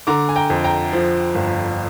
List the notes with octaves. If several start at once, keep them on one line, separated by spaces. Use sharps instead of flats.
D3 A#5 D6
G#5
G5 A#5
F2
G5 A#5
F3
G1